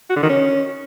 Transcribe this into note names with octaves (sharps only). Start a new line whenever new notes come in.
F#4
D3
D#3
C#4